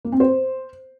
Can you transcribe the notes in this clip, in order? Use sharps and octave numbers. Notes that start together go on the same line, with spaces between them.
A#3
C4
C5